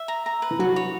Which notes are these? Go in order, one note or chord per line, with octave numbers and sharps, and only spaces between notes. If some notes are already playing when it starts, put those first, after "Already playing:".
Already playing: E5
A#5
A#5
B4
E3
F#3 F#4
C#5